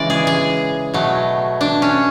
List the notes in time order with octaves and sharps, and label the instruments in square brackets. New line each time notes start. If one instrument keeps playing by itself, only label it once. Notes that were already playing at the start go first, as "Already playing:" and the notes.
Already playing: [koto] C#3 E3 G#3 D5
G#4
G#4
B2 F#3 A3
D4
C#4